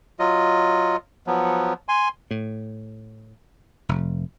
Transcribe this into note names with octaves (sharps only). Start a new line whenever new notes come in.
F#3 F4 D#5
F3 F#3 B3
G#5 C6
A2
F1